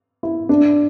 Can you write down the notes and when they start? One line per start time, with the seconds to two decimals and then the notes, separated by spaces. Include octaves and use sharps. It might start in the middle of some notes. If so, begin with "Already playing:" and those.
0.23 E4
0.49 D4